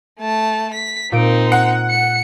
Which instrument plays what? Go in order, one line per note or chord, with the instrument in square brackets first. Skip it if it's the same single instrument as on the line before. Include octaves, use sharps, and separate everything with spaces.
[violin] A3 A5
B6
[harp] A#2 D7 [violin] C4 D#4
[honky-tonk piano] F#5
[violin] C#7